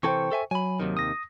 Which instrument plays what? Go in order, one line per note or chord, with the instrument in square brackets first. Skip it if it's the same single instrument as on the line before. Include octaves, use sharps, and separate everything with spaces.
[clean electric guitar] C3 E3 A4 [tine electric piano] C5 G5 C#6
[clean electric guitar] A4 E5 G#5
[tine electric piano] F#3 [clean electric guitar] G#5 B5
[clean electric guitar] D#2 C3 D#3
[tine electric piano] D#6 A#6